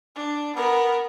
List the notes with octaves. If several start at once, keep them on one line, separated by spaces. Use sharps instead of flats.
D4
B3 A#4